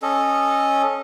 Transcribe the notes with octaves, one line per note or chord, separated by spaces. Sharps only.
C#4 A4 D#5